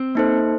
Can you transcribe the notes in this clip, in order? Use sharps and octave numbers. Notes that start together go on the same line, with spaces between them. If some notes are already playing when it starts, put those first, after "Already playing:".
Already playing: C4
A#3 D#4 A4 C5